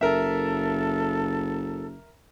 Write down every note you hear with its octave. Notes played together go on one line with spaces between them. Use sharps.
F#1 A4 A#4 E5